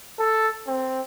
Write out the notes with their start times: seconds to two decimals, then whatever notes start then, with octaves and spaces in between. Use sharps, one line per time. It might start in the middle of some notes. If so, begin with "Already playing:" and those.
0.19 A4
0.67 C4